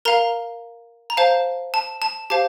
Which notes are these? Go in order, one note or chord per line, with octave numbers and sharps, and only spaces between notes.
A#4 F5 A#5
A#5
C5 F5 A5
A5
A5
G4 C5 F5 A5